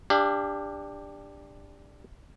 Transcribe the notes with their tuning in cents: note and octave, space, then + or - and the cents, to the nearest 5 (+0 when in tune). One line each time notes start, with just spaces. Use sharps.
D4 +0 G4 +25 F5 -25